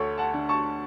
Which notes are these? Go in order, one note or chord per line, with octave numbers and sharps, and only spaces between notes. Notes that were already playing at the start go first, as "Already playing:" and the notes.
Already playing: D2 A4 C#5
F#5 A5
D3
A5 C#6